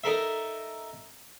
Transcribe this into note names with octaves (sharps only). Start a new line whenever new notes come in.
D#4 A4 A#4 E5